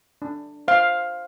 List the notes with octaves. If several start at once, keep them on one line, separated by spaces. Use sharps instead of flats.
D4
C5 F5